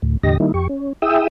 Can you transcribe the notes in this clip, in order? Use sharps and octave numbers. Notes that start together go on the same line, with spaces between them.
D2 A2
E2 A2 D3 G4 D#5 A#6
D#3 G3 A#3 D#4 E4
F2 G4 C#6
C#4
E4 G#4 E5 G5 D#6 E6